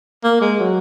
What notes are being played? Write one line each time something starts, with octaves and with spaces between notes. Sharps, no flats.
A#3
G#3
F#3